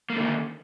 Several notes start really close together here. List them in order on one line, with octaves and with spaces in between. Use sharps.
A#3 A3 D3 D#3